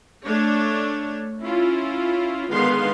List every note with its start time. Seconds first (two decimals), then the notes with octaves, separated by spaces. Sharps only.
0.25 A3 D4 C#5
1.41 C#4 E4 F4
2.51 D3 D#3 G#3 B3 F5 C6